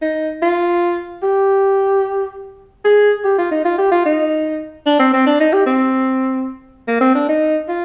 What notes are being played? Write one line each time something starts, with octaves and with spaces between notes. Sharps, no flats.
D#4
F4
G4
G#4
G4
F4
D#4
F4
G4
F4
D#4
D4
C4
C4
D4
D#4
G4
C4
A#3
C4
D4
D#4
F4